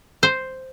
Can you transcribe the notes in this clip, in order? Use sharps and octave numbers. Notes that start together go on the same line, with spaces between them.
C5